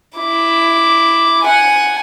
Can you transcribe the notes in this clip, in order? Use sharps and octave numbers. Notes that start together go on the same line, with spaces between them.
E4 D6
F#5 G#5